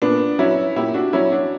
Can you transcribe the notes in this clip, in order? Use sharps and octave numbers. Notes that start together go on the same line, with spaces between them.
A#2 B3 D4
F#3 C#4 E4
A#2 E4 G4
D4 F#4
F#3 C#4 E4
D4 F#4